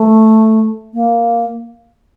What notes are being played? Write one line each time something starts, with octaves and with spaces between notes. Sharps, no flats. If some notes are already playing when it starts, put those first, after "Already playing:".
Already playing: A3
A#3